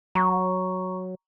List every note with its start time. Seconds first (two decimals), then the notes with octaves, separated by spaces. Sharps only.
0.15 F#3 A#5 C#6